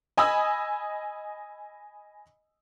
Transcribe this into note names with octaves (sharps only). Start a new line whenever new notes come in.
D#5 G#5 B5 D#6 E6